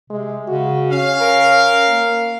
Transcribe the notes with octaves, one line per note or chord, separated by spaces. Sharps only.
C3 G#3
C#3 F#4
C#4 F5
A#4
A#3